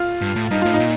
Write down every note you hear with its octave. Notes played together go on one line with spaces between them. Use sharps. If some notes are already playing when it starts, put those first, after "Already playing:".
Already playing: F4
G2
A2
G2 D#4
A2 F4
D#4
A#2